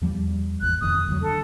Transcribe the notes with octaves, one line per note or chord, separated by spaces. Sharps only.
E2 F3 G3
G#1 E2 F#6
E1 F2 D#3 D#6
D2 D#3 F#3
D3 A4